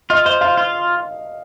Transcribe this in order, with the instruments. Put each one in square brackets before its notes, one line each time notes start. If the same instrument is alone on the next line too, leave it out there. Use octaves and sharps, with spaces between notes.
[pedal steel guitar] F4 [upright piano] D#5
[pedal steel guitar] C5 [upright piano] D#5
[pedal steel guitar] F4 [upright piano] F5
[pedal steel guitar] F4